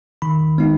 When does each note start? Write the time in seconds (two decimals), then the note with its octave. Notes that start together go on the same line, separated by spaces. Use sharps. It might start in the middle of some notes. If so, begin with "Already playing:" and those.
0.22 D#3 B5
0.58 G#3 B3 D#4